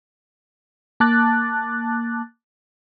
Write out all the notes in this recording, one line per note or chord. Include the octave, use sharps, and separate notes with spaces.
A#3 A5 D6 F#6 A6